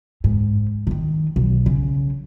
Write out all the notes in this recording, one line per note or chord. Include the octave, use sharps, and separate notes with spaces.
G#2
D3 D#3
B1
C#3